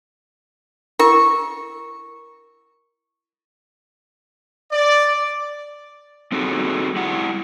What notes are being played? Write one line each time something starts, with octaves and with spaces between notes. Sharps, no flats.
E4 A#4 C#6
D5
G3 C4 D#4 F#4 G#4 A4
G3 E4 F#5